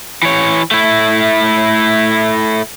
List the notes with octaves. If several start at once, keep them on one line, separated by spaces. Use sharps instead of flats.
E3 C#5
A3 E4